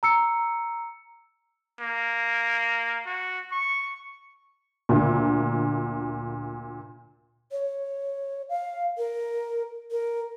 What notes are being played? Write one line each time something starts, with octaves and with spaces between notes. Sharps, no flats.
A#5 E6 C#7
A#3
F#4
C#6
D2 A#2
C#5
F5
A#4
A#4